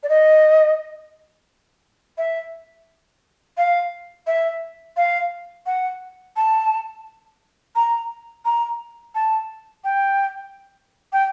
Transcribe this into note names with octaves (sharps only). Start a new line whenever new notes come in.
D5
D#5
E5
F5
E5
F5
F#5
A5
A#5
A#5
A5
G5
G5